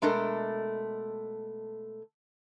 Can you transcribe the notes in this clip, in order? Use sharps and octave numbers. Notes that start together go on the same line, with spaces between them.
B2 G#3 A3 D4 A4 A#4